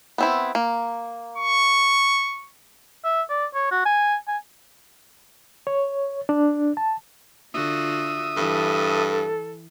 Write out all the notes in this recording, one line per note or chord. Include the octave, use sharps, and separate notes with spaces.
B3 C4 E4
A#3
C#6
E5
D5
C#5
F#4
G#5
G#5
C#5
D4
A5
D3 F4 F#4 E5 D#6
G2 E3 A4